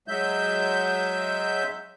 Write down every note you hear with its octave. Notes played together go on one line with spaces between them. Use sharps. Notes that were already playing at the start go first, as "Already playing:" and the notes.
F#3 G#3 E5 G6